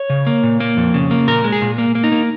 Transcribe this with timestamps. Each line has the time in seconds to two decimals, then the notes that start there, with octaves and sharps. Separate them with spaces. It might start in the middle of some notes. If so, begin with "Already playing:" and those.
Already playing: C#5
0.10 C#3
0.27 A#3
0.43 A#2
0.60 A#3
0.77 F2
0.94 C#3
1.11 A#3
1.27 A#2 A#4
1.44 G#3
1.52 G#4
1.62 A#2
1.78 A#3
1.95 A#3
2.04 D#4
2.12 A#3